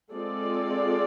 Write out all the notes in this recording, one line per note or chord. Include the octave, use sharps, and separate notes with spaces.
G#3 C4 F4 A4 D5